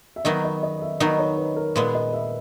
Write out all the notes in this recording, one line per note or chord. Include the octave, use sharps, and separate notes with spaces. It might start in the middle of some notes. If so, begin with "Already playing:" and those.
E5
D#3 F#3 B3 D#4 D#5
D#5
D#5
E5
D#3 F#3 B3 D#4 D#5
C#5
B4
A#4
A#2 G#3 B3 B4
D#5
E5